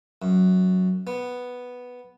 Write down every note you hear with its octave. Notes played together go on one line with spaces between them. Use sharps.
F#2
B3